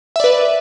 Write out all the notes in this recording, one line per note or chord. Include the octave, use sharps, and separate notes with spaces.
B4 D5 E5